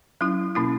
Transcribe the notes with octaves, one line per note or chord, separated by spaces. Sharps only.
F#3 C#4 E4
B2 A#3 C#4 E4